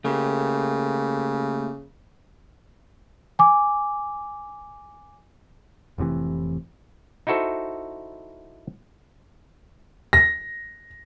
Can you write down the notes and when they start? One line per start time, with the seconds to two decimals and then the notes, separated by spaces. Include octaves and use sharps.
0.05 C#3 A3 A#3 G4
3.39 G#5 D6
5.98 F1 A2 C3 E3
7.27 D#4 E4 F#4 A4 C5
10.13 A#6